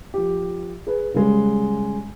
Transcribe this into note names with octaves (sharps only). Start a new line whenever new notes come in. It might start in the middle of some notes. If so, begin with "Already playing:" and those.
F3 G4
G#4 B4
C#3 G3 G#3